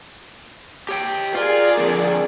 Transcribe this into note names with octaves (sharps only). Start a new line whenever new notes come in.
G4 C#5 G5
F4 G#4 A#4 D5
F2 D3